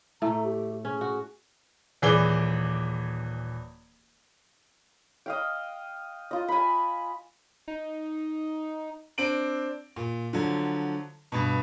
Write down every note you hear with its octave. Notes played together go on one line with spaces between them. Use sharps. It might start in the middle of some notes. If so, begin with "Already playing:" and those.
A2 A3 A#5
G4
C#4 G#4
F#4
D#1 E3 G#4 D5 G7
D#5 F5 G5
F4 D#5
G#5 B5
D#4
C4 D4 D7 F#7
A#2
D3 F3 F#3
G2 B2